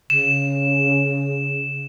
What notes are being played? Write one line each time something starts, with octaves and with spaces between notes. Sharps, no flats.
C#3 E7